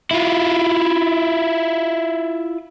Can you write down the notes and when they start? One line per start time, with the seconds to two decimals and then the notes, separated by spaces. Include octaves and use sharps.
0.11 E4 F4